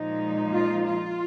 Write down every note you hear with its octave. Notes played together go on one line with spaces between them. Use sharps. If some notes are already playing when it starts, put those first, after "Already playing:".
Already playing: A#2 F3 G#3 D#4
F4
F4